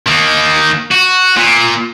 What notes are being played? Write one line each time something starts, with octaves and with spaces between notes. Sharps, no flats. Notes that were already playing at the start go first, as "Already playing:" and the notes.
D#3 A#3
F#4
A#2